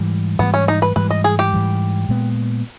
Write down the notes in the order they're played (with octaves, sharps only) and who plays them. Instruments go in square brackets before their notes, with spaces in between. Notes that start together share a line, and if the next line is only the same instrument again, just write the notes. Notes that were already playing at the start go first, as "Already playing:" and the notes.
Already playing: [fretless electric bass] G#2 E3 G3
[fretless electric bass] G#2 E3 G3 [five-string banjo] B3
[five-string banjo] C#4
D#4
B4
[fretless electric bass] G#2 E3 G3 [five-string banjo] B4
[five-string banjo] D#5
G#4
G4
[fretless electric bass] G#2 E3 G3
A#2 G#3 B3